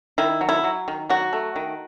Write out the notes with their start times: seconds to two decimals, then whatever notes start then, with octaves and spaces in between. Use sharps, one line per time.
0.18 D#3 E4
0.41 F#3
0.49 E4
0.64 F#3
0.88 D#3
1.09 F#3 F#4
1.33 A3
1.56 D#3